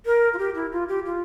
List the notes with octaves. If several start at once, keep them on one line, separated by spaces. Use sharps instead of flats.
A#4
F4
G4
E4
F4
G4
F4